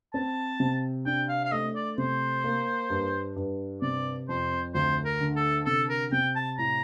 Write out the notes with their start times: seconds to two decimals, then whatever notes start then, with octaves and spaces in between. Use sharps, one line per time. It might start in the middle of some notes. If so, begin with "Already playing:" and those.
0.14 C4 A5
0.60 C3
1.06 D4 G5
1.29 F5
1.45 F5
1.52 A3 D#5
1.75 D5
1.98 C3 C5
2.44 A#3
2.90 G2
3.36 G2
3.82 C3 D5
4.29 F2 C5
4.74 D2 C5
5.05 A#4
5.21 D3
5.36 A4
5.66 C3 A4
5.90 A#4
6.12 C3 G5
6.36 A5
6.58 A2 A#5